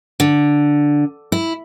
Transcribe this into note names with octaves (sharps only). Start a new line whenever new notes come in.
D3
E4